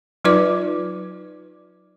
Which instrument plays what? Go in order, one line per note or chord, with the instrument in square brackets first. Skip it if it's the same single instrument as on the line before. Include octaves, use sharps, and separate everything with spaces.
[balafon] F#3 D#4 F4 B4 D5 D6